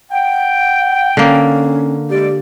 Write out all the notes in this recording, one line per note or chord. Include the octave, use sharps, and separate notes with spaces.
F#5 G5
D3 A#3 C#4
G#3 G4 A4 D5